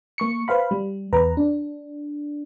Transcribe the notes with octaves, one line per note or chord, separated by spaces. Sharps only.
A#3 C#6 C#7
B4 C5 F5 B5
G3
E2 B4 A#5
D4